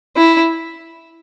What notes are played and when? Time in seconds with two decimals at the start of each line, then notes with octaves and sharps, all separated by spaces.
0.16 E4